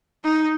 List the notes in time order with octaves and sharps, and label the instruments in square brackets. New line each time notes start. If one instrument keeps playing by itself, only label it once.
[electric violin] D#4